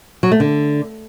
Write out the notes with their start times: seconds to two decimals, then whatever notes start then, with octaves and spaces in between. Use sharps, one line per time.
0.23 F#3
0.31 A3
0.40 D3